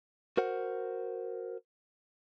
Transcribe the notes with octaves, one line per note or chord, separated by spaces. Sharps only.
F#4 A#4 C5 F#5